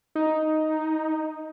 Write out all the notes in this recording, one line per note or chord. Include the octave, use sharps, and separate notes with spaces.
D#4